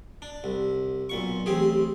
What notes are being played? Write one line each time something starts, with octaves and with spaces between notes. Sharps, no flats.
D4
C2
B1 A#2 C#6
A1 C4 G4 G#4